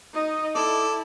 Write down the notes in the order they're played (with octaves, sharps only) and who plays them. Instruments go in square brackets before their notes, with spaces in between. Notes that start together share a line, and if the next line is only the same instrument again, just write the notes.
[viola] D#4 D#5
[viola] E4 [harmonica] A4 D5